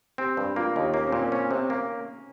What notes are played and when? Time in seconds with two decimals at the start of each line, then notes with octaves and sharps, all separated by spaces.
0.18 C4 G4
0.37 G2 G4
0.56 A#3 F4
0.76 D#2 D#4
0.94 A#3 C#4
1.07 C4
1.12 A#2
1.19 C#4
1.32 C4 C#4
1.51 C3 C4
1.70 A#3 C#4